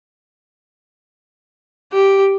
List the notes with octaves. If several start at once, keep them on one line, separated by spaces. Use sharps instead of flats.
G4